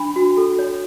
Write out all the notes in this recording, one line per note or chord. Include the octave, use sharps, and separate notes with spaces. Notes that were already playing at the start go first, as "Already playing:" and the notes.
Already playing: D4 B5
F#4
A4
C#5